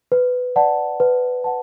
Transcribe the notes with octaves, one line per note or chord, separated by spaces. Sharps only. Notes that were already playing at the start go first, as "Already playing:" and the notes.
B4
D5 F#5 A5
B4
F#5 A5